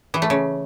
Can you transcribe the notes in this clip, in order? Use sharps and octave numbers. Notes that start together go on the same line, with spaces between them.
E3
A3
C#3